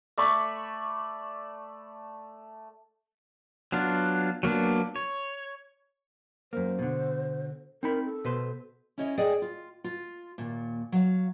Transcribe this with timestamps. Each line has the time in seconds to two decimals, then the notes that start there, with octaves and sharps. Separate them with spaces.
0.18 A3 D5 B5 C#6
3.72 F#3 B3 D4 F4
4.43 F#3 A#3 B3 D4
4.96 C#5
6.53 F#2 A#3 C5
6.79 B2 D3
7.83 C4 D#4 A#4 B5
8.05 A4
8.25 B2 B4 C5
8.98 C#4 E4 C#5 D#5
9.17 G#4 A4 D5 D#5 G5 G#5
9.42 F4
9.84 F4
10.38 D#2 A#2
10.92 F#3 F5